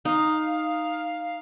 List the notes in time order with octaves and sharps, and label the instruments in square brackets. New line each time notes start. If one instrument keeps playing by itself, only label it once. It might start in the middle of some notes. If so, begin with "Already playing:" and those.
[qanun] D#4 [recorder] F5